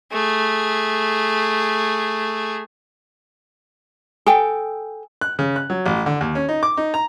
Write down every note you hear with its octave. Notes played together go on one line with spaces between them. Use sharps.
A3 G#4
A4 G5 G#5 D#6
F#6
C#3
F#6
F#3
A1
D3
D#2
C#4
D#4
D6
D#4
A#5